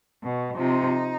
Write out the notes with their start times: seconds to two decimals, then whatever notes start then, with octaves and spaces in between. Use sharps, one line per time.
0.22 B2
0.57 C3 F3 D#4